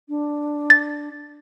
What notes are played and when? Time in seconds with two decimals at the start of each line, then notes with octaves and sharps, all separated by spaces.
0.09 D4
0.70 A6